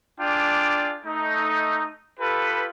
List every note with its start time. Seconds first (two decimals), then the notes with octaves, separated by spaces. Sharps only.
0.20 D4 F4 G#4 D5 G5
1.05 A3 D#4
2.19 F4 G4 A4 B4